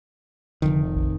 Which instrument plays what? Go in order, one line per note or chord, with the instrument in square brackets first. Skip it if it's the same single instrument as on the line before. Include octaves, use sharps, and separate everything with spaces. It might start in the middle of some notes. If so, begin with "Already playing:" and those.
[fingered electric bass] F1 F2 D#3 [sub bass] D3
[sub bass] A#1